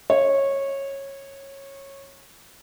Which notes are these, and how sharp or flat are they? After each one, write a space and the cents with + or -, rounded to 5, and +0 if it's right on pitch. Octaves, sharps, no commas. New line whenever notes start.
C#5 -15